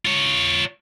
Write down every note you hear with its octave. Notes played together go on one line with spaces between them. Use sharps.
F4 C#5